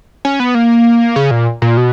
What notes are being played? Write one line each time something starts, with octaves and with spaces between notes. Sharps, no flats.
C#4
B3
A#3
C#3
A#2
A#2
B2